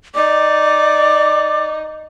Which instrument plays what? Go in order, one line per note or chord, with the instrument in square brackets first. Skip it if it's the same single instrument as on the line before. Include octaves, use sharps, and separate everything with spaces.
[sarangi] D#4 [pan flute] D5 [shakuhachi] D6